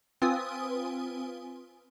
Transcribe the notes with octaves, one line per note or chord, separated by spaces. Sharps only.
C4 F4 B4 G#5 D#6